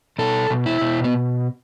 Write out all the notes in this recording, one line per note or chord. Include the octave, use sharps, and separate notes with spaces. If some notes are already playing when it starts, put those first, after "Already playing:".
B2 A4
B2
E4
B2
B3